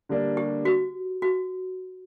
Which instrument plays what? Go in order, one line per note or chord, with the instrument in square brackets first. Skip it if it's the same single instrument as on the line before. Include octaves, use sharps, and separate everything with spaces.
[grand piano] D3 G3 A#3 D4
[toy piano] G4
F#4
F#4